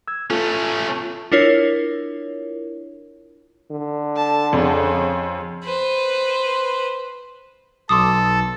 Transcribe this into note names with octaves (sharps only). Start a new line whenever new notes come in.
E6 G#6
A3 C#4 F4 A4
D4 E4 F4 A#4 C#5
D3
A5
F2 C#3
B4 C5
B1 A4 C6 D6 D#6